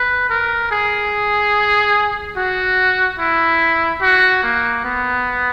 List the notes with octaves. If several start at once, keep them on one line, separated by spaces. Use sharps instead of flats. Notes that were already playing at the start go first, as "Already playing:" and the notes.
Already playing: B4
A#4
G#4
F#4
E4
F#4
A#3
B3